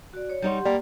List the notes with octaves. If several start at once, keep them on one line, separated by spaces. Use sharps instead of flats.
F#4 D5
C#5
G3 D#4 G4 C#5 F#5 C6
G3 A#3